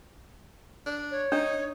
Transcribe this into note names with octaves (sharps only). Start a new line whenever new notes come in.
D4
C#5
D4 D#4